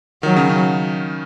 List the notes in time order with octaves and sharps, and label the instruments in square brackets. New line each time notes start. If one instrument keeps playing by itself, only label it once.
[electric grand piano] D#3 [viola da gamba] F#3
[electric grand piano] C#3
C#3